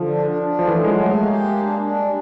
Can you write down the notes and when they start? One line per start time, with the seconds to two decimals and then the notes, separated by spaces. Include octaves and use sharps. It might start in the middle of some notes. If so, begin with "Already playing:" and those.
Already playing: D3 F3
0.08 D4
0.25 D4
0.42 D4
0.59 F3 A3
0.68 E3
0.76 F3 F#3
0.84 G#3
0.93 A3
1.11 G#3 A#3
1.28 G4
1.44 A#3
1.62 D4
1.78 D4
1.96 G3